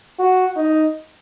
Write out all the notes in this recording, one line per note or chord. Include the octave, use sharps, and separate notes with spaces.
F#4
D#4